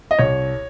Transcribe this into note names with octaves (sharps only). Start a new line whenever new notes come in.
D#5
C2 C#5